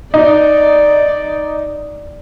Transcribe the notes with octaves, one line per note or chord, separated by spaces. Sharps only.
D#4 D5